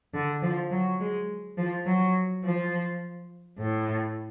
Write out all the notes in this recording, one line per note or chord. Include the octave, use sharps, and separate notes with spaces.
D3
F3
F#3
G#3
F3
F#3
F3
A2